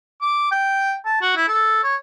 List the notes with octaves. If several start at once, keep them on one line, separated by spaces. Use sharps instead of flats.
D6
G5
A5
F#4
E4
A4
C#5